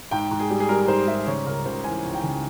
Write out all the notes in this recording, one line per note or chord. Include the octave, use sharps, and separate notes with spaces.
G#2 G5
G#2
G#4
G3
G#4
G3 A#4
G#2 C5
G3 E5
C#3 C#5
C#2 A#4
C#2 C5
E3 G#5
C#2
G5
C#3